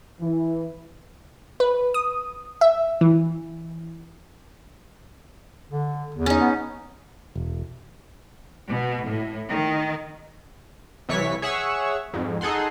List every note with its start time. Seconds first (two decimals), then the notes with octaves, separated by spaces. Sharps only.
0.20 E3
1.60 B4
1.94 D#6
2.61 E5
3.01 E3
5.70 D3
6.14 E2
6.26 C#4 D#4
6.40 B3
7.35 E1
8.68 B2
9.04 A2
9.51 D#3
11.09 C2 E3 C#5 C#6 B6
11.42 G#4 C#5 E5 F#5 C#6 E6
12.13 F2 G#2
12.41 D#4 G#4 A4 F#5 C6